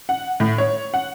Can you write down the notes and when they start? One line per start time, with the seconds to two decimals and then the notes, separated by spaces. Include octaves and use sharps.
0.09 F#5
0.40 A2
0.58 C#5
0.94 F#5